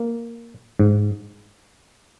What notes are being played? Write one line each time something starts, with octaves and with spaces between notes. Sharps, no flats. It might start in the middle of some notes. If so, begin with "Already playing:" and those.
Already playing: A#3
G#2